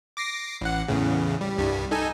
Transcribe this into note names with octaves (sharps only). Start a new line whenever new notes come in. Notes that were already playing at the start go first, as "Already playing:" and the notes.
D6 A#6 C7
A1 F#5
E2 A2 C#3
G3
C2 G2 G3
D#4 A4 G#5